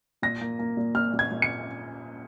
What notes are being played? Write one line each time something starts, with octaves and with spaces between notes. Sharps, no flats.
A#2 A#6
A#3
A#3
A#2
A#2 F6
A#2
G#6
A#2
C#7